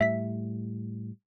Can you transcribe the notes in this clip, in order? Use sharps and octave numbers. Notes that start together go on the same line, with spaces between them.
A2 G3 E5 B6